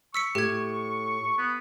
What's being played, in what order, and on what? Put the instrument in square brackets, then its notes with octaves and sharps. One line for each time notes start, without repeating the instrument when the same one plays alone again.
[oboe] C#6 [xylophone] E6 B6 C#7
[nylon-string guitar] A2 [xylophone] G4 G#6
[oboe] B3